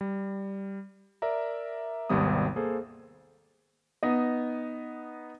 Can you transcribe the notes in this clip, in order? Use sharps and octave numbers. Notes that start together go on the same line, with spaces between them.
G3
A#4 D5 E5 A#5
G#1 D#2 C3 G3 B3 D#6
A#3 G#4 A4 C5
B3 D#4 D#5